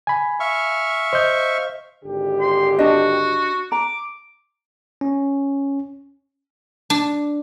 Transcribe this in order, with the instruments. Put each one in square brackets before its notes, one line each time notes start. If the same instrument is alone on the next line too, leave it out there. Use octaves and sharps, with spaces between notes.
[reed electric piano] G#5 B5
[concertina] E5 F5 C#6
[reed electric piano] C5 D#5 G6
[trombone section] G#1 D3 G4
[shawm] C6
[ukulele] D4 D#5 [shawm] F#4
[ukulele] A#5 [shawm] D6
[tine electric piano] C#4
[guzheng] D4